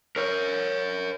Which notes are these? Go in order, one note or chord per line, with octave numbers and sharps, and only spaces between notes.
A#4 C#5